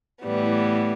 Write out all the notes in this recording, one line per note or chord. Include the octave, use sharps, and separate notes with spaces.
A2 E3 G3 B3